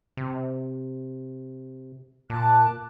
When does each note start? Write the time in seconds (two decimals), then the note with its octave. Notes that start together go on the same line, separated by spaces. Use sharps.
0.17 C3
2.30 A#2 A5 D6 F#6